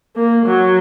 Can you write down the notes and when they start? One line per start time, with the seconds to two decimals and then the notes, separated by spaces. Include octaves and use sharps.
0.16 A#3
0.46 F#3